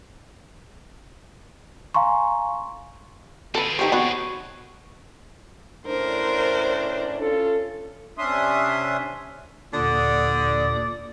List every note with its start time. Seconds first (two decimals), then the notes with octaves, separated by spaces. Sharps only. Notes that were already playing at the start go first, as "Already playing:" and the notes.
1.94 F5 G#5 A#5 C6 C#6
3.55 C4 G#4 A4 B4
3.79 D#4 G4 C5 C#6
3.92 B3 F#4 C#5
5.86 A2 C#4 D4 A#4 C5
7.20 C#4 F4 A4
8.18 C3 C#4 D4 E5 C6 D#6
9.74 D#2 A#2 D3 D5 D#6